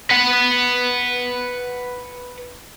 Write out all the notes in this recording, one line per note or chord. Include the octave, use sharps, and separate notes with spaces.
B4 F#5